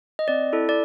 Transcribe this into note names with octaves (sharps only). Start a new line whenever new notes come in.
D#5
C4 D5
E4 A4
D5